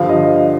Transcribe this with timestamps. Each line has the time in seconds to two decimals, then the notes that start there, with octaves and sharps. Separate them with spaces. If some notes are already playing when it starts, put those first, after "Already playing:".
Already playing: G2 D3 F3 F5
0.09 D#5